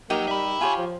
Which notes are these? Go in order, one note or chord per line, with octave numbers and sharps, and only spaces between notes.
F#3 A#3 D#4 G4 A#4
G3 E5 B5
F4 G4 C#5 G#5
F3